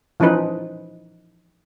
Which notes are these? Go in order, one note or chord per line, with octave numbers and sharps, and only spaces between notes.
E3 F3 C#4 D#4 B4